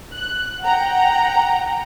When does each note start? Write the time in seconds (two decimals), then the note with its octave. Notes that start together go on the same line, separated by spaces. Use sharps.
0.14 F#6
0.63 F#5 G5 A#5